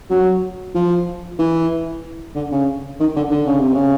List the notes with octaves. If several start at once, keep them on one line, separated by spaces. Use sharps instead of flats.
F#3
F3
E3
D3
C#3
D#3
D3
D3
C#3
C3
C#3